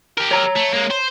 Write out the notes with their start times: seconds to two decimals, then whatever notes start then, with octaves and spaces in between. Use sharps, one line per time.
0.18 G4 A#4
0.31 C#5 A#5
0.56 A3
0.74 G#3 A#3
0.91 C5